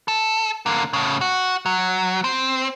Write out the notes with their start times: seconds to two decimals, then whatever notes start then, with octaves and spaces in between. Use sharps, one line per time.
0.08 A4
0.66 D3 A#3
0.93 A2 C#3
1.21 F#4
1.66 F#3
2.24 C4